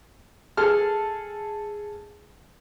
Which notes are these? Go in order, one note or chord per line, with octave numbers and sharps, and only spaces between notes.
G#4 A4 F6